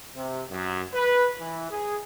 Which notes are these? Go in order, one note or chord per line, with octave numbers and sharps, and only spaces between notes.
C3
F#2
B4
E3
G#4